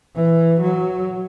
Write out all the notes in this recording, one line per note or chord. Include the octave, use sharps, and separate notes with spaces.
E3
F#3